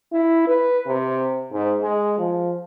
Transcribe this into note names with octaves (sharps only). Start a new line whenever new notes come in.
E4
B4
C3
G#2
G#3
F3